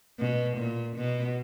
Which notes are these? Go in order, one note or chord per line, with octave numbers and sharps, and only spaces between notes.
B2
A#2
B2